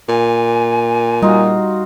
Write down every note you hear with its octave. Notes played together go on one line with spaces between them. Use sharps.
A#2 G#5
G3 D#4 F4 F#4